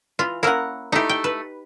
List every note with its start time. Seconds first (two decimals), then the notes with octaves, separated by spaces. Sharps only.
0.19 E3 F4
0.43 A#3 C#4 E4 A#4 F#5
0.92 A3 D#4 E4 G4
1.09 G5
1.24 B4